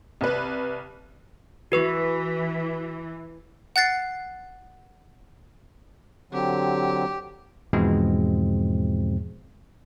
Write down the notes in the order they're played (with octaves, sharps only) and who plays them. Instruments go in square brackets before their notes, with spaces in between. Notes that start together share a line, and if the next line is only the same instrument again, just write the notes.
[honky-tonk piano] C2 B4
[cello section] E3 [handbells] F#4 B4 C#6
[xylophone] F#5 F#6 A6 C7
[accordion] D3 F#3 C4 [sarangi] G4
[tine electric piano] E2 G#2 B2 F3 G#3 C4